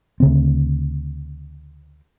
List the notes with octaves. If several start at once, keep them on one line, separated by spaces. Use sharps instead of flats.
D2 C#3 C4